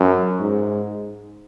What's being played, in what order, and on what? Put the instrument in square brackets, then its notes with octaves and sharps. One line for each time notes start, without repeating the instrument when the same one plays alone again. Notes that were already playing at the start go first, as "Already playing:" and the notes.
Already playing: [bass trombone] F#2
G#2